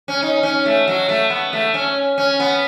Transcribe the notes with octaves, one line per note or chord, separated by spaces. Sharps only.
C#4
D#4
C#4
A3
F#3
A3
B3
A3
C#4
C#4
B3